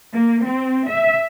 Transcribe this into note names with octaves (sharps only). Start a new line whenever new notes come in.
A#3
C4
E5